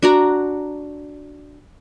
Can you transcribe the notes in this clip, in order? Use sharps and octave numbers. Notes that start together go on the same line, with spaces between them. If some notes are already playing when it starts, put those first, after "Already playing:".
D4 F#4 A#5